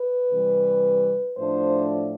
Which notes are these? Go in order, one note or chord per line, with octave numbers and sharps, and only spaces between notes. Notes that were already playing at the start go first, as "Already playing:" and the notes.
Already playing: B4
C3 E3 G3
A2 F3 A3 D4 C5